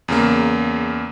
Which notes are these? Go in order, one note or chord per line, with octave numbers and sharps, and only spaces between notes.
E2 C#3 A#3